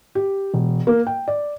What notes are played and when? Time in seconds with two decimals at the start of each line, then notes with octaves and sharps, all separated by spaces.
0.15 G4
0.54 E1
0.87 A#3
1.07 G5
1.28 D5